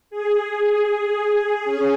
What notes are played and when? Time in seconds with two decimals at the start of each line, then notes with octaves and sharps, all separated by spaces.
0.10 G#4
1.03 G#4
1.65 C#4